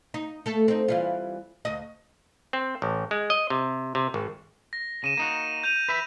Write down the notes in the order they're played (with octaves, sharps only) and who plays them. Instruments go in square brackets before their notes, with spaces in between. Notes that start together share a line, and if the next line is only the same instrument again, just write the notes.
[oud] D#4
A3 A4
C4 D#4
E3 G3 F4
D2 D#5
[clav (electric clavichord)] C4
A1
G#3
D#5
C3
C3
G#1
[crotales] A#6
[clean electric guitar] C#3 [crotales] D#7 E7
[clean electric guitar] A#3 D#4 F#4
[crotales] G6 D#7 F7
[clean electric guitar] B4 E5 B5